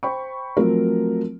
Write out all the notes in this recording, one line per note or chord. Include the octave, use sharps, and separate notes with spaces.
C5 G5 B5 C#6
F3 F#3 A3 C4 A#4